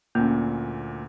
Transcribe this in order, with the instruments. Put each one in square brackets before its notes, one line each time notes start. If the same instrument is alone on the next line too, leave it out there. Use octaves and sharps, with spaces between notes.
[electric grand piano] D2 A#2 [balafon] A#3 C#4